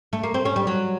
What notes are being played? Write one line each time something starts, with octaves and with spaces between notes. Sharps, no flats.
A3
A#3
C4
C#4
G3
F#3